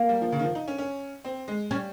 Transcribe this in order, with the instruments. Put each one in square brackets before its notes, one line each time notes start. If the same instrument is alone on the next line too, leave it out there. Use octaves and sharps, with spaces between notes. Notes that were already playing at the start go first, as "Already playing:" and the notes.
Already playing: [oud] A#3
[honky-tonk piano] G3
F3
C#3
D#3
F3
D#4
C#4
C#4
C4
G#3
[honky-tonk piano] G3 [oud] C#4